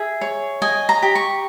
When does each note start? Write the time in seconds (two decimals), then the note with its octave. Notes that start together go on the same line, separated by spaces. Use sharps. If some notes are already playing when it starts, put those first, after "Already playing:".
Already playing: G#4 E5
0.21 C#5
0.62 D#5 G#5
0.89 A#5
1.03 G4
1.15 C#6